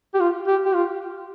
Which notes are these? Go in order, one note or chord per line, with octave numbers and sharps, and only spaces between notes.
G4
F4
G4
G4
F4